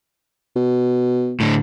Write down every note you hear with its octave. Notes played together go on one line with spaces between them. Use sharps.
B2
A2 D3